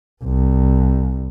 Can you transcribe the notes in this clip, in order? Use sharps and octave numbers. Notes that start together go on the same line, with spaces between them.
C2